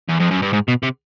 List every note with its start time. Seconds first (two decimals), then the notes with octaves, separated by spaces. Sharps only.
0.09 E2
0.20 F2
0.31 F#2
0.42 G2
0.53 G#2
0.68 B2
0.83 C3